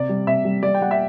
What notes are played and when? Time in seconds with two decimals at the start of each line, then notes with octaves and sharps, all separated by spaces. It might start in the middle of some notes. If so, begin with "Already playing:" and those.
Already playing: C3 D5
0.09 G3
0.27 C3 E5
0.45 G3
0.63 G3 D5
0.74 G5
0.81 G3 F#5
0.91 E5